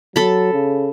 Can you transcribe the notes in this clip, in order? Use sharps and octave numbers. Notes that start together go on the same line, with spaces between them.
F#3 A4 B5
C#3